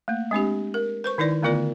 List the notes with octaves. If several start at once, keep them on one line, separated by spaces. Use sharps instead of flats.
A3 A#3
G#3 C4 D4 G4
A#4
B4 C5 C#6
D#3 D#4 E4 B4 D5
D3 A3 B3 F4 A#4 D5